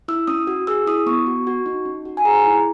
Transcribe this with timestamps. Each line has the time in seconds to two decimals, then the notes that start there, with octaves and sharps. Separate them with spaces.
0.08 E4 E6
0.27 C#4 D#6
0.47 F#4
0.67 G#4 E6
0.87 E4 D#6
1.06 B3 C#6
1.27 F#4
1.47 F#4
1.66 D#4
1.86 C#4
2.05 F#4
2.17 G#5
2.25 G#4 A#5
2.45 E4